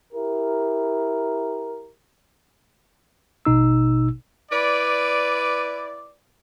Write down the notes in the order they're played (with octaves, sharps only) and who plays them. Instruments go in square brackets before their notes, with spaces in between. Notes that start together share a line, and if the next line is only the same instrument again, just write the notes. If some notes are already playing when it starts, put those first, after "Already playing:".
[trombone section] E4 G4 A#4
[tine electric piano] A1 B2 D#4 E6
[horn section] E4 B4 D5